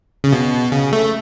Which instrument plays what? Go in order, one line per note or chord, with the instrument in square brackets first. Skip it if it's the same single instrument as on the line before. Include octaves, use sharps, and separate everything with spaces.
[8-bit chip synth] C#3
B2
C#3
A3